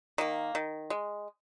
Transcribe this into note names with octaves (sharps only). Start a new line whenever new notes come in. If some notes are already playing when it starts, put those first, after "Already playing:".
D#3 A#3
D#3
G#3